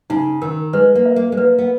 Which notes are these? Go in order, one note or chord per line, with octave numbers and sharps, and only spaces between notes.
C#3 D#4
D#3 A#4
G#3 B4
A#3
E5
A#3
G#3
A#3 B4
B3